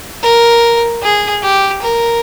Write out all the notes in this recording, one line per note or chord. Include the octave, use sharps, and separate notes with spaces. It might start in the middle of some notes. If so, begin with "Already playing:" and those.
A#4
G#4
G4
A#4